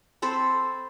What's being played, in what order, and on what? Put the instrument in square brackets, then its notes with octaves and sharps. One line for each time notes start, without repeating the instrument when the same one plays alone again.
[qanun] C4 A4 C5 B5